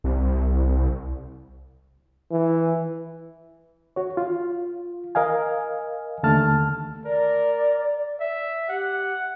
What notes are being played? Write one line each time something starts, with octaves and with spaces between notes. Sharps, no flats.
C2
E3
F#4 C#5
F4
A#4 D#5 F5 G#5
D#2 D3 A3 A5 F6
A#4 D5
E5
G4 F#5